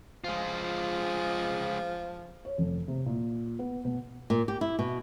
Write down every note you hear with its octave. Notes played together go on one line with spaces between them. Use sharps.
F3 G#3 F4
C#5
F1
C3
A#2
B3
B2
A#2
G4
E4
B2